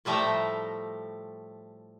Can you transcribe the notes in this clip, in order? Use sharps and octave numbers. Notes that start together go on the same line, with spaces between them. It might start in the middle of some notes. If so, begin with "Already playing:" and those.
A2 F3 G3 A3 E5 A#5